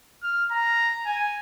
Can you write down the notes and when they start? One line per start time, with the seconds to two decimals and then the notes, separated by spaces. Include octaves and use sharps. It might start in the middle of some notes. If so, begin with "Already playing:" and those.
0.23 F6
0.51 A#5
1.06 G#5